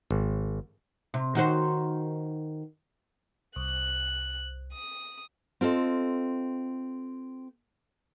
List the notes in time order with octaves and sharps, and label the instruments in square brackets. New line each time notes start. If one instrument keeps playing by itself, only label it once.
[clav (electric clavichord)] G#1
[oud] C3
D#3 F#4 C5
[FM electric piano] C2 [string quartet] F#6
[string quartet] D#6
[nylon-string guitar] C4 F4 A4 D#5